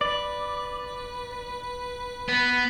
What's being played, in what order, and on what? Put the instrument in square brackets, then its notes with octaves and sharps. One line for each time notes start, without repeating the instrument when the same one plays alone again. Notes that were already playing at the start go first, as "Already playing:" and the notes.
[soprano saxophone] B4 [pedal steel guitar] D5
[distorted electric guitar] B3